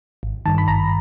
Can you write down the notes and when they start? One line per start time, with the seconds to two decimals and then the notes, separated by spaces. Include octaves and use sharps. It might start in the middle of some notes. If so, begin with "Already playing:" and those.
0.23 G#1
0.45 G2 D#3 A5
0.58 B5
0.67 G#1 A#5